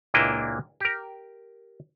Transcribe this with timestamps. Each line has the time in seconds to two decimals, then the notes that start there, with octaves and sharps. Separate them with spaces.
0.14 C#2 A#2 A#3 D4 E4 D#5
0.80 G4 A#4